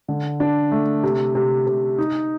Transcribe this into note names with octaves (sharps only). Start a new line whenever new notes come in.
D3
D4
A3
C3
C3
C3
D#4